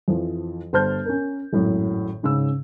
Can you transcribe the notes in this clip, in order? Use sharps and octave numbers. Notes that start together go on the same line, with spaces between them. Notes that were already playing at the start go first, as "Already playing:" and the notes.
F2 E3 F3
G1 C5 A5 F6 G6
C#4 A#4
G#1 F#2 A2
G#2 C#3 C#4 E6